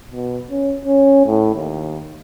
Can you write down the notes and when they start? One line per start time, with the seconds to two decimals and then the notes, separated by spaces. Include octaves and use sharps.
0.11 B2
0.51 C#4
0.85 C#4
1.26 A2
1.55 D#2